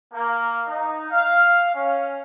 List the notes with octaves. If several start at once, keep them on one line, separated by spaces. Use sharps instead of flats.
A#3
D#4
F5
C#4